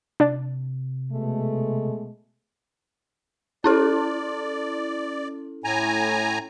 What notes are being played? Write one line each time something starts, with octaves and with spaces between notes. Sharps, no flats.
C3 D4 D5
B2 G#3 A3
C#4 E4 A4 D5
A2 G#5 A#5